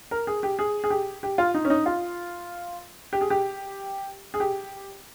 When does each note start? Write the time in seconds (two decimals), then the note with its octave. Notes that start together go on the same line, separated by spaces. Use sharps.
0.11 A#4
0.27 G#4
0.43 G4
0.59 G#4
0.84 G#4
0.90 G4
1.23 G4
1.38 F4
1.54 D#4
1.65 C#4
1.70 D#4
1.86 F4
3.13 G4
3.21 G#4
3.30 G4
4.34 G#4
4.40 G4